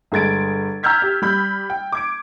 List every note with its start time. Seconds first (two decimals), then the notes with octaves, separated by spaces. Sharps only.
0.12 G1 G#3 G#6 A6 D7
0.83 A#5 E6 F6 G6 G#6 B6
1.02 G4
1.22 G3 B5 G6
1.70 G5
1.92 D6 G#6 D7